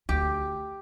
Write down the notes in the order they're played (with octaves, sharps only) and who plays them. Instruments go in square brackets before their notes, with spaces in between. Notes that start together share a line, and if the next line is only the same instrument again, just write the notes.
[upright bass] D2 [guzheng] G4